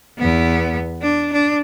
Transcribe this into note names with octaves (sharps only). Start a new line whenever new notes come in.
E2 B3
D4
D4